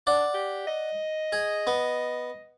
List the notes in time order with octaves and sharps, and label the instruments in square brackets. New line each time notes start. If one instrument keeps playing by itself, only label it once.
[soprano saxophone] D4 [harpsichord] D5 F#5
[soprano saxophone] G4
D#5
[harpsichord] G#4
B3